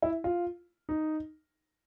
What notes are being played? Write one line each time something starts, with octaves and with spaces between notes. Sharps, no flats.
E4
F4
D#4